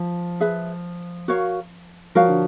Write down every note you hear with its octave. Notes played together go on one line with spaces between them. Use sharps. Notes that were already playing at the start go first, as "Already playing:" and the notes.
Already playing: F3
G#4 B4 E5
F#4 A#4 C#5 F5
F3 F#4 A#4 C#5 F5
D3